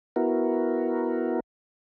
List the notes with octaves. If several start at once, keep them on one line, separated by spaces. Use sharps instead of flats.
B3 E4 F#4 A#4